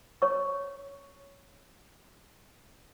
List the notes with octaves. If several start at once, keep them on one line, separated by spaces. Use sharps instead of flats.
C#5 C#6